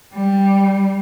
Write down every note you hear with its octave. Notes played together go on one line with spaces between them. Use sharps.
G3